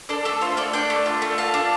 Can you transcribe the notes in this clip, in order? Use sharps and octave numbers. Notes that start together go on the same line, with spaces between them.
D4 A4 D5
A3 A4
F4 C5
A3 A4 D5
D4 D5 G5
A3
F4
A3
F4 F5 A5
D4